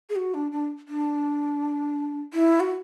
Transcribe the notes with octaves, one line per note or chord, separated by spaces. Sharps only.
G#4
F#4
D4
D4
D4
E4
F#4